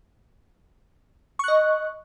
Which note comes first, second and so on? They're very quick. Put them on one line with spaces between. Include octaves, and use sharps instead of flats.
C#6 F#6 D#5